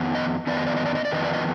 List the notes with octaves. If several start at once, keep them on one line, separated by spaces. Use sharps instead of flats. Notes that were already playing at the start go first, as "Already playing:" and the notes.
Already playing: F2 D#3 B3
D#5
F2 D#3 B3 D5
D#5
D5
D#5
D5
D#5
D5
F2 D#3 B3 D#5
D5
D#5